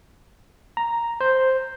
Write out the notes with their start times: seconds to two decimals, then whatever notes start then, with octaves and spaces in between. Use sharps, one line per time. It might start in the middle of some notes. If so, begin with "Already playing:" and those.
0.77 A#5
1.21 C5